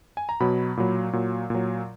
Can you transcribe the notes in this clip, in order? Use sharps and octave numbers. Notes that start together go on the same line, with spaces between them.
G#5
A#5
B2 F#3 B5
A#2 F#3
A#2 F#3
A#2 F#3